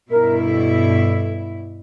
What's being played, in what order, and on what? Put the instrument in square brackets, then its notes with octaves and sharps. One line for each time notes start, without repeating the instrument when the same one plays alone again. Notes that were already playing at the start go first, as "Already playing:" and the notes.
[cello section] G2 B2 E4 [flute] A#4
[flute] A4